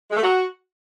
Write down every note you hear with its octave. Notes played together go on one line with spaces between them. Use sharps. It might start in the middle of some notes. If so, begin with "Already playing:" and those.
G#3
A3
F#4